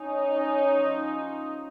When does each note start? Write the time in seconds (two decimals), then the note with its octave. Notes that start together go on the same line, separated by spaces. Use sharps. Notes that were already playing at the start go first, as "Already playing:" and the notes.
Already playing: C#4 D#4
0.36 C#4
0.77 F3